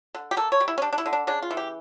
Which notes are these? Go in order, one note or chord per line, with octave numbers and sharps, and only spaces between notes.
D3
G4
A#3 A4
C#5
G3
E4
C#4
G3 D4
D4
E4
D3
D4
C#3 D4
F4
E3
G4